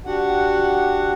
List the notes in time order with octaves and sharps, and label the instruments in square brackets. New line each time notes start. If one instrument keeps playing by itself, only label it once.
[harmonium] D4 F#4 G4 F#5